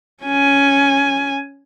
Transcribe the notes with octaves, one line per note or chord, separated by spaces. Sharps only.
C#4 G#5